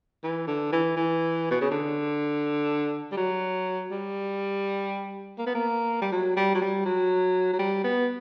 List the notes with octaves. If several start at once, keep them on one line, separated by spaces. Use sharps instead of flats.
E3
D3
E3
E3
B2
C#3
D3
G3
F#3
G3
A#3
B3
A#3
G3
F#3
G3
F#3
G3
F#3
F#3
G3
B3